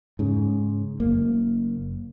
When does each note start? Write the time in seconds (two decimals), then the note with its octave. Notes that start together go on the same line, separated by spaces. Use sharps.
0.19 G#2 C#3
1.00 F#1 A#3